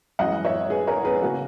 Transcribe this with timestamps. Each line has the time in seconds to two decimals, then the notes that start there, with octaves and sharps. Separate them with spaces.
0.19 F#2 E3 G#3 D#5 F#5
0.45 C#5 E5
0.70 G#4 B4
0.87 A#4 C#5
1.04 G#4 B4
1.22 C#3 F#3 A#3 F#4 A#4